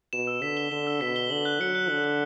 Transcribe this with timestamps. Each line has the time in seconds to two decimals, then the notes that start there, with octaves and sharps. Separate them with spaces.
0.13 B2 E7
0.27 E6
0.42 D3 B6
0.57 G7
0.72 D3 E7
0.87 E6
1.01 B2 B6
1.16 G7
1.30 D3 F#7
1.45 F#6
1.60 F#3 C#7
1.75 F#6
1.89 D3 F#7
2.04 F#6